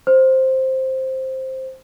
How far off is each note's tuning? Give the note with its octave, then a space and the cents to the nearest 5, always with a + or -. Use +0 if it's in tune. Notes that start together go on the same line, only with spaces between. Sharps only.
C5 +5